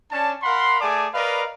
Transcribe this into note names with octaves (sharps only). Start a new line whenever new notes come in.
C#4 D4 A5
A#4 F5 F#5 B5 C6
A3 G#4 D5 G#5 A5 D6
A#4 B4 D5 D#5 F5 B5